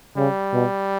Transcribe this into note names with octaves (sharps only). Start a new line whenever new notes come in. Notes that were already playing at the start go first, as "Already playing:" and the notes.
C#3 G3
B2